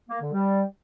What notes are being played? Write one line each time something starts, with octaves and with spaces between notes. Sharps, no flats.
A#3
D3
G3